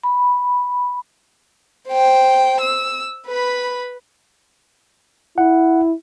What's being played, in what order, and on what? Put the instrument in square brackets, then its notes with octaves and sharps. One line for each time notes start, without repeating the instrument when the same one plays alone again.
[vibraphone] B5
[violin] C5 G5
E6
B4 B5
[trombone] E4 [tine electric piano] F#5